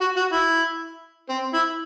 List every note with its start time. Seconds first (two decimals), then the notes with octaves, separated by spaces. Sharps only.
0.01 F#4
0.17 F#4
0.33 E4
1.29 C4
1.54 E4